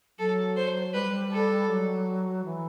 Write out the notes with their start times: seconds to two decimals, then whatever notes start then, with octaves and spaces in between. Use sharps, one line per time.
0.19 F#3 A4
0.57 C5
0.94 G3 B4
1.31 A4
1.69 F#3
2.44 E3